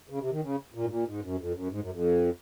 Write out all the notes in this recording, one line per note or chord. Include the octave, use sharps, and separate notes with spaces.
C#3
C3
D#3
C#3
A#2
G#2
A#2
G#2
F#2
F2
F#2
G#2
F#2
F2